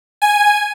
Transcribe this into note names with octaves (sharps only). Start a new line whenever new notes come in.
G#5